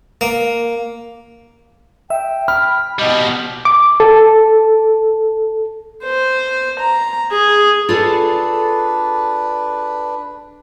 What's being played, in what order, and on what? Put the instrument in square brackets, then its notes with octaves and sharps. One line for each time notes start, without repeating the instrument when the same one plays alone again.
[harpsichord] A#3
[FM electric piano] E5 [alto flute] G5
[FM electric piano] B5 [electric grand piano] F6
[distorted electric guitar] B2 G3 [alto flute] D#5
[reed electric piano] D6
A4
[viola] C5
A#5
G#4
[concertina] D4 B4 [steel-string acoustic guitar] F4 G#4 A4